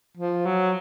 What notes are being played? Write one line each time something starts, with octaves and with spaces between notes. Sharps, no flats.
F3
F#3